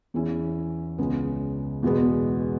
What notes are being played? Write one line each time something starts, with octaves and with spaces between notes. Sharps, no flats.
E2 E3 C#4 E4
C#2 C#3 G#3 B3
E2 B2 G#3 B3